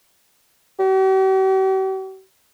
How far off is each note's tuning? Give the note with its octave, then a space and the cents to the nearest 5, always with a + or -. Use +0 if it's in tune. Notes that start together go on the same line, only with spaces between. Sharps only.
G4 -45